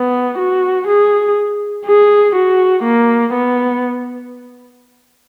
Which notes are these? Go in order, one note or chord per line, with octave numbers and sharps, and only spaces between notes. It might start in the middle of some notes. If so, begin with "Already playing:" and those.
Already playing: B3
F#4
G#4
G#4
F#4
A#3
B3